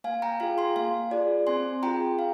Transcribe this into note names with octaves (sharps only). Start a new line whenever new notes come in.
A#3 F5 G#5
G5 A#5
F4 G#4 F5 G#5
G#5 C6
A#3 F5 G#5
F4 G#4 D5
C4 G#5 C6
F4 G#4 G5 A#5
F5